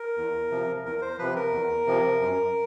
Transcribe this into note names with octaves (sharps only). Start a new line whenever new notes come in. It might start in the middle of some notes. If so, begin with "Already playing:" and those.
Already playing: A#4
E2
C3 F3
E2 A#4
C5
C3 F3 B4
A#4
E2
C3 F3
F#2